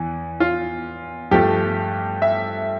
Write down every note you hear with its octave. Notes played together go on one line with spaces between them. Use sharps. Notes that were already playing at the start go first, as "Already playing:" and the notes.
Already playing: E2 E3
F4
G2 F3 A3 G4
E5